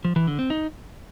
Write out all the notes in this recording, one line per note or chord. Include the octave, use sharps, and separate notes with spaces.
F3
E3
D3
C4
D#4